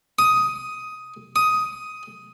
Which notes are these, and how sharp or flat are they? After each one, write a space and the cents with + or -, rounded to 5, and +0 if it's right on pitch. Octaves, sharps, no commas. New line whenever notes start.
D#6 +10
D#6 +10